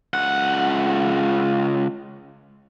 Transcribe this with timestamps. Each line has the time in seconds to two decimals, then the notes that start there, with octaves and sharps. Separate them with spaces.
0.14 C#2 F#5